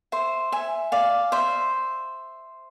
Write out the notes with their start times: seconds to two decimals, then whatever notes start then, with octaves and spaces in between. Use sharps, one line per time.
0.12 C5 E5
0.52 E5 G#5
0.92 D5 F5
1.32 C5 E5